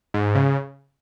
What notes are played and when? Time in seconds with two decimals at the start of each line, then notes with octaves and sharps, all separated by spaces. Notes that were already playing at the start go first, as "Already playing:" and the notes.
0.14 G#2
0.35 C#3